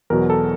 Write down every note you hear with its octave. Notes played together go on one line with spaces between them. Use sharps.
E2 B2 F#3 A#4
A4